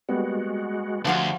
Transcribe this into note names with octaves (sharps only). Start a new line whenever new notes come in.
G3 G#3 A#3 B3 F#4
D2 F3 F#4 F5